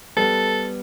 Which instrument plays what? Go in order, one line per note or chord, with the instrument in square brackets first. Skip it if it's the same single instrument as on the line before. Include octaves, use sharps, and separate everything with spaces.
[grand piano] G3 B3 [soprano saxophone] A4